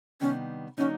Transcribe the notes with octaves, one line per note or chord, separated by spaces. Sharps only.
C3 D#3 G3 B3 C#4 D4
D3 F#3 A#3 C#4 D#4